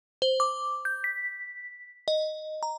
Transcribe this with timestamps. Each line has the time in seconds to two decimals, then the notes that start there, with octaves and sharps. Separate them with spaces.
0.22 C5
0.40 D6
0.85 G6
1.04 B6
2.08 D#5
2.63 A#5